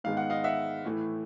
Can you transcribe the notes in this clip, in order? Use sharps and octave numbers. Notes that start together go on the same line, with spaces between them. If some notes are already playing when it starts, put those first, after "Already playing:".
G#2 D#3 G#3 B3 F5
F#5
D#5 F5
E5 F#5
A2 E3 A3